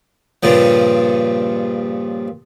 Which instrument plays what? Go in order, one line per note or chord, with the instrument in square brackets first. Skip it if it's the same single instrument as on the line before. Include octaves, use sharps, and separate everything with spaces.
[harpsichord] G2 A#2 C#3 F3